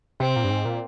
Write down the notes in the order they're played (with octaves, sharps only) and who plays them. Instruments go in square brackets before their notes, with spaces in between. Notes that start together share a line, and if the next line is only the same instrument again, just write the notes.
[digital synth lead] C3 [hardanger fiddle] C4
[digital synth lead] A#2
G2
G#2
A#2